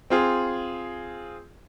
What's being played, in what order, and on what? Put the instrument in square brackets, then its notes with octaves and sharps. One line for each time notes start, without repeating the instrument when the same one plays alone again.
[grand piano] C4 F4 G#4